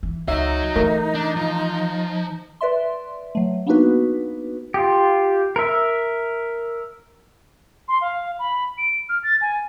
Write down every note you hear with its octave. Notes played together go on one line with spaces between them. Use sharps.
E3
C#2 D#4 F#4 C#5 E5
E3 A3 A#4
D4
F3
B4 D5 E5 C6
F#3 A3
A#3 B3 D4 D#4 F#4 B4
F4 G4
A#4 E5
C6
F5
B5
D7
F6
A6
G#5